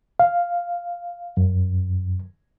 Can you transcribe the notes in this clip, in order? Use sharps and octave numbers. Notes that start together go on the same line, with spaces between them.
F5
F#2